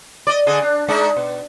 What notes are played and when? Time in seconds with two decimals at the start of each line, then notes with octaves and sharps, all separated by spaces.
0.27 D5 D#5
0.46 D3 G#4 D#5
0.62 D4
0.88 G#3 D4 D#4
1.16 B2